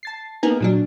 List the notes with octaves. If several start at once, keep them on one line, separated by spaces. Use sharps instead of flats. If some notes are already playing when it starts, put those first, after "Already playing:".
A5 A6 C7
A#3 B3 D#4 G#4 A#4
A#2 F#3 D4